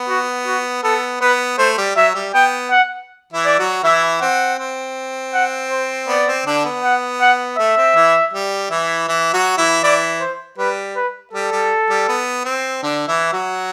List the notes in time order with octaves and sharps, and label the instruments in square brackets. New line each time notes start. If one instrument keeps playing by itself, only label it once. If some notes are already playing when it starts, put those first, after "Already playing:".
Already playing: [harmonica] B3
[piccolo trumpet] F#4
F#4
[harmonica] B3 [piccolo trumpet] A4
[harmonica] B3 [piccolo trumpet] B4
[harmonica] A3 [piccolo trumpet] C5
[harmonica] G3
[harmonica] F#3 [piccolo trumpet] E5
[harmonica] G3
[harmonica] B3 [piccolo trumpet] G5
[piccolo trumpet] F#5
[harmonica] E3 E4
[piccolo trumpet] D5
[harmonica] F#3 F#4
[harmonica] E3 E4 [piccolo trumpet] E5
[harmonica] C4 [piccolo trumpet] F#5
[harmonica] C4
[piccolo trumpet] F#5
C5
[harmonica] B3 [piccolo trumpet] D5
[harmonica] C4
D3 D4
B3
[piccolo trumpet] F#5
F#5
[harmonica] A3 [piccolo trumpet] E5
[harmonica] C4
E3 E4
G3
E3 E4
E3 E4
F#3 F#4
E3 E4
[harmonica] E3 E4 [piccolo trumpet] D5
[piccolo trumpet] C5
[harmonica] G3 [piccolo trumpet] B4
[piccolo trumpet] B4
[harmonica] G3 [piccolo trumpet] A4
[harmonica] G3
G3
B3
C4
D3 D4
E3 E4
F#3 F#4